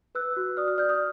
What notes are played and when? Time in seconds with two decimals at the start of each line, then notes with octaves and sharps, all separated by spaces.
0.15 B4 E6 F#6
0.37 F#4
0.57 D5 D#6 F6
0.68 D#6 F6
0.78 D5 F6 G6
0.89 D#6 F6